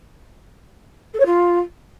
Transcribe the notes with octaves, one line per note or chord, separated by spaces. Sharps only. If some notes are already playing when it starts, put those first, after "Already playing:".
A4
C#5
F4